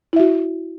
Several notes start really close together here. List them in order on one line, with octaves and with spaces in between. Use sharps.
E4 E5 F#4